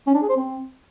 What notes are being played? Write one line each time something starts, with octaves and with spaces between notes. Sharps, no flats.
C#4
D4
G#4
C5
C4